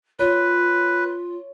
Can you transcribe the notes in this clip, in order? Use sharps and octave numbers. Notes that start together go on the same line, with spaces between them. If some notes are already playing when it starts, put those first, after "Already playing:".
F4 B4 C#5